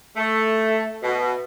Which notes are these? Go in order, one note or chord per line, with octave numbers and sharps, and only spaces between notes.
A3
B2